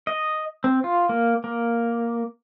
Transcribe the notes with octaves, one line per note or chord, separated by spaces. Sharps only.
D#5
C4
F4
A#3
A#3